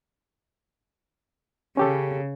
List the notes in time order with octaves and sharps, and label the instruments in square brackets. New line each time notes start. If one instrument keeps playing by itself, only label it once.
[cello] C#3 [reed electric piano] C#4 G4 A4